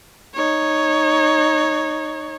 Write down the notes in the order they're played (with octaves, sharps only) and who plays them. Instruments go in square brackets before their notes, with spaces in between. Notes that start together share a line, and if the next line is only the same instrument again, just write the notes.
[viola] D#4 C#5